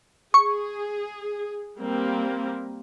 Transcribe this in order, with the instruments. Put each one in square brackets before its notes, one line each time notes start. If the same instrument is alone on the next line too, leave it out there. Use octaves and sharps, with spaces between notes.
[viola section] G#4 [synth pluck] C#6
[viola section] G3 A#3 C4